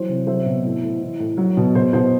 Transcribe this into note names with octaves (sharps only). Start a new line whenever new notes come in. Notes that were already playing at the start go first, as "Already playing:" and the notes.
Already playing: E3 F#3 C5
C3
F#3 C5 E5
B2
A2
A2
E3
A2
F#3
B2
B2 C5
B2 C5